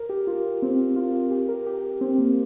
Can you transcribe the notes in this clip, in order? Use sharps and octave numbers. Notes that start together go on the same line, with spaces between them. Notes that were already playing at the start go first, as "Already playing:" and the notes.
Already playing: A#4
G4
F4
C4
F4
G4
A#4
G4
C4
A#3